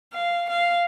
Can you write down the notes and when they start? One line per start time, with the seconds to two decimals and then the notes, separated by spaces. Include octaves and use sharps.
0.14 F5
0.51 F5